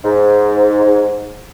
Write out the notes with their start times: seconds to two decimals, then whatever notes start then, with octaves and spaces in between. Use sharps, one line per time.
0.04 G#2